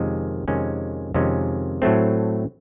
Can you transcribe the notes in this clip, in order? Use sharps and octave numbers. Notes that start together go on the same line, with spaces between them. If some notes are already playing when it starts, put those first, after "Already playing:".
Already playing: F2 C3 D#3 G#3 C#4
F2 C3 D#3 G#3 C#4
F2 C3 D#3 G#3 C#4
A2 F#3 A3 C4